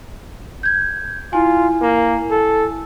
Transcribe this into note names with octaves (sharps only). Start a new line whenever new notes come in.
G6 G#6
E4 F4 G#5
A#3
A4